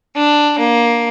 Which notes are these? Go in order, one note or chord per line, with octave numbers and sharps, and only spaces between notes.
D4
A#3